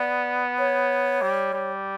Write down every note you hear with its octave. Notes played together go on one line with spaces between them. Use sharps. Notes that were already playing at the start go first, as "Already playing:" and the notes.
Already playing: B3 D5
C#5
G3
G3